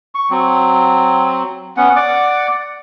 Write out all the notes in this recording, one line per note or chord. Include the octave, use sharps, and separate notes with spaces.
C#6
F#3 C4
B3 C#4 F#5
D5 F#5 D6